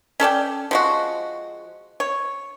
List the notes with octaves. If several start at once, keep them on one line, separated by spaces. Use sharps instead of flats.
C#4 A4 D5 G5
F3 G#3 F#4
C#5